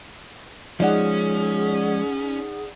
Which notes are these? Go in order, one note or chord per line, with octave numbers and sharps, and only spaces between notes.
F3 G#3 C#4 D#4 G#4 D5 F#5